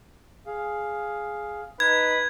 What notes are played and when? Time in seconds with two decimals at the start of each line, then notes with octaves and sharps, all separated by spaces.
0.46 G#4 F5
1.80 D#4 B4 G#6